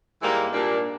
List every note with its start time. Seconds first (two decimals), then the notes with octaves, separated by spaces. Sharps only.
0.22 G#2 E3 G3 A#3 D#4
0.53 A#2 G3 A#3 D4